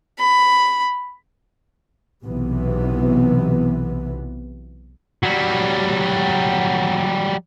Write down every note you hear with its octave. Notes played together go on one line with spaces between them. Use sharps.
B5
B1 C3 E3 B3
F#3 G3